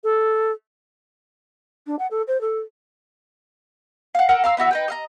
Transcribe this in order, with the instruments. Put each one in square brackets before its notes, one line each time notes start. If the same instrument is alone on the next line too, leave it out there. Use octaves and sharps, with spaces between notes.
[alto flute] A4
[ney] D4
F#5
A4
C5
A4
[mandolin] F5 F#5
A4 A#4 F#5
F5 A#5 C6 E6
B3 E4 F#4 E5
D#4 B4 G5
D#5 F5 A#5